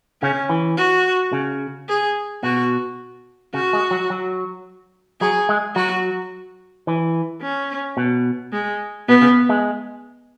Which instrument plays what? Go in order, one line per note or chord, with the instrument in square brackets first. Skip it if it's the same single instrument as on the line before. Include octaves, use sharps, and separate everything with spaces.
[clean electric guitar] C#3 [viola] C#4
[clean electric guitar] E3
[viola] F#4
[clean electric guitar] C#3
[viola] G#4
[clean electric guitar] B2 [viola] F#4
[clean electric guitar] C#3 [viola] F#4
[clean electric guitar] G#3
F#3
F#3
[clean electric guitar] F#3 [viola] G#4
[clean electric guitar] G#3
[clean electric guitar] F#3 [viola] F#4
[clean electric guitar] E3
[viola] C#4
[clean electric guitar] B2
[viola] G#3
[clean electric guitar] B2 [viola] B3
[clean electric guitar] C#3
G#3